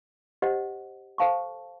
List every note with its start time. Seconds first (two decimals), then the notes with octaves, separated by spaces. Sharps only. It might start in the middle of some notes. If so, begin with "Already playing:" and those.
0.42 G4 C5 D#5 F#5
1.18 A4 C5 F5 A5 C#6